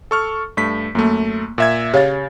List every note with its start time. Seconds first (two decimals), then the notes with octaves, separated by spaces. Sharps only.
0.11 A4 C#6 F6
0.57 G2 A3 B6
0.95 F#2 A3 A#3
1.58 A#2 E5 G#6
1.94 C#3 G4 C#5 F5 A6